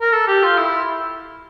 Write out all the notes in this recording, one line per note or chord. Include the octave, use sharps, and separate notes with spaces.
A#4
A4
G4
F4
E4